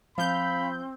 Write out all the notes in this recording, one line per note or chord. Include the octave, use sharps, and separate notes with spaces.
F3 C4 F5 B5 G6